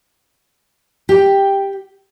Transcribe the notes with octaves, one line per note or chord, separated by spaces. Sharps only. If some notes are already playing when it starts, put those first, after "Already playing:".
G4 G5